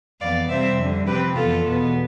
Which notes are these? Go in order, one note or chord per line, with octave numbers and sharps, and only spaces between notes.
F2 E3 B3 D5 F5
C3 G3 C4 C5 E5
F2 D3 G3
C3 F3 C4 G4 B4
F2 E3 B3 F4 A4
E2 B2 B3